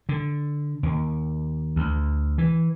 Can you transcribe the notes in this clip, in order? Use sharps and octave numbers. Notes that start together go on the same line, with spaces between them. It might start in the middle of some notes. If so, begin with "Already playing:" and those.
D3
D#2
D2
E3